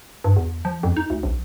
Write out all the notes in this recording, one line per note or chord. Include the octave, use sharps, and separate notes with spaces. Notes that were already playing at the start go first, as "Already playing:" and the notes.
G2
E2
F3
F2
D#4
D2
A#1